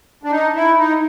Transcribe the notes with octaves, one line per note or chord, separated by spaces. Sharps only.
D4
D#4
E4
D#4